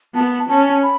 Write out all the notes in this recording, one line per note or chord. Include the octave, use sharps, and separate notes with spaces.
B3 A5
C#4 A5
B5